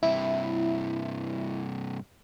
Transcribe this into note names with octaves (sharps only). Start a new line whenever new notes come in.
G2 C3 E4